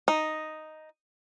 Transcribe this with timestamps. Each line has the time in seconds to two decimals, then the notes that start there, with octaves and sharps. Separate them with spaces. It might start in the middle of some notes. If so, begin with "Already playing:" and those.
0.08 D#4